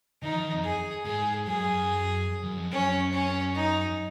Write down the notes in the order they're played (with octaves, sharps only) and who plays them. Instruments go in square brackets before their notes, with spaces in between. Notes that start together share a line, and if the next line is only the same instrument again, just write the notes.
[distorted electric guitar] D#3 [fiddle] D#4
[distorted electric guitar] F3
D#3
F2
[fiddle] G#4
[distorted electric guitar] G#2 [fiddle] G#4
[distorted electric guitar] F#2 [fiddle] G#4
[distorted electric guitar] F#2
F2
[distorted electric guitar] F#2 [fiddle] C#4
[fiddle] C#4
D#4